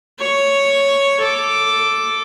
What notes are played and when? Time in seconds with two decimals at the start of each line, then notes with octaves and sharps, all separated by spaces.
0.20 C#5 C#6
1.20 A4 D6